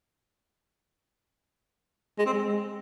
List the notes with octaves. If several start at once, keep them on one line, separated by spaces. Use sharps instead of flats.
G#3
C4
G#3